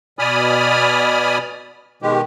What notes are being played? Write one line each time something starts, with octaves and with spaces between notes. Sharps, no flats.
B2 D5 G#5 B5 D#6 F6
B2 D#3 G#3 G4